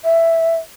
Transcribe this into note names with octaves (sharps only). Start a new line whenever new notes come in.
E5